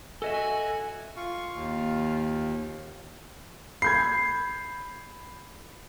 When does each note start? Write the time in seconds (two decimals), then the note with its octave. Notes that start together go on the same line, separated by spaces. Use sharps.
0.22 F#4 A4 D#5 E5 G#5
1.17 F4 C#6
1.54 D#2
3.82 B5 G6 G#6 C7